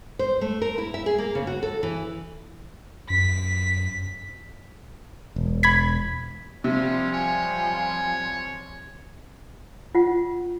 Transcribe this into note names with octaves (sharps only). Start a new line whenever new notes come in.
C5
A3
A#4
E4
E5
G#4
A#3
C#3
F#4
A4
E3
F#2 B6
E1
B5 G#6 B6
C3 F3 G3 C#4 F4
C#5 G#5
F4 F#5